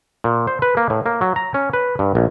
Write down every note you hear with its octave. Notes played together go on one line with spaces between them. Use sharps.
A#2
C5
B4
A#3
A2
A#3
F#3
A#5
C#4
B4
G2
A#1